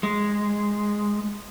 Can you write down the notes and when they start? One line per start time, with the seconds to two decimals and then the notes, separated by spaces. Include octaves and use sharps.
0.03 G#3